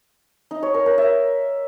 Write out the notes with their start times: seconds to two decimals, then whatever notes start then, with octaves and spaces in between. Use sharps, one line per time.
0.51 D#4
0.63 C#5
0.74 A#4
0.86 A#4
0.98 E5